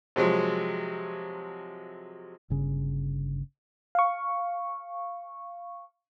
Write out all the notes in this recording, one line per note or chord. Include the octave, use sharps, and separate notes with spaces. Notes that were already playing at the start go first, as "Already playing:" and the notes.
C3 F3 F#3 G#3
G1 C#3
F5 C#6